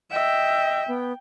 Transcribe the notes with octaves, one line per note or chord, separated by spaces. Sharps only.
D#5 E5 G5
B3